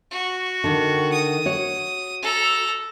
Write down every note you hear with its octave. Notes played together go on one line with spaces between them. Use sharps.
F#4
D3 D#3
D#6
F#4 C#5
A4 A#5